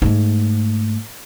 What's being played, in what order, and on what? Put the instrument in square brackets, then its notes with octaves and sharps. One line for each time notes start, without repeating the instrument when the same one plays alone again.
[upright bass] G#2 A3